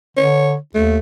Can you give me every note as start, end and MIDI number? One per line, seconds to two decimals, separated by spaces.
0.17 0.57 50
0.17 0.54 73
0.75 0.99 39
0.75 0.98 57